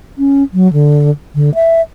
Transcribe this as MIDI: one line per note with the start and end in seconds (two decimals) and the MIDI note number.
0.18 0.43 61
0.54 0.71 54
0.73 1.11 50
1.35 1.54 50
1.54 1.81 76